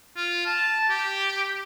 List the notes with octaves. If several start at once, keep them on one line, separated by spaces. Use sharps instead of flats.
F4
A5
G4